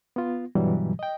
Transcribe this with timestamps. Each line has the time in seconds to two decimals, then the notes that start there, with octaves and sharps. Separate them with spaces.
0.16 B3 F4
0.55 G2 B2 E3 F#3 G3
0.99 D#5 G5